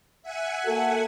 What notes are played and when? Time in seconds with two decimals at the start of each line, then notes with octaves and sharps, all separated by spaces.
0.22 E5 F#5 G#5
0.66 A#3 F#4 A4